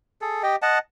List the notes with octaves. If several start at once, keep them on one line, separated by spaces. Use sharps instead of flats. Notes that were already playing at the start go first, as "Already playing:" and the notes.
G#4 A4
G4 D#5 G5
D#5 F#5 A5